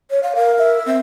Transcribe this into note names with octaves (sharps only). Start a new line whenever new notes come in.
C#5
F5
A#4 F5
E5
C4